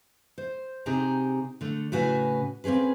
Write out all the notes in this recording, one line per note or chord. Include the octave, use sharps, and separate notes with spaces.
C5
C3 D#4 G4 G#4 A#5
D3 A3
A2 C#3 F#4 B4 G#5
A#3 C4 C#4 G#4 B4